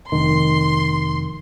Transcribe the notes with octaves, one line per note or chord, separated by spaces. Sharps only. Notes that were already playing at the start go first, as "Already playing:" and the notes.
F1 D#3 C6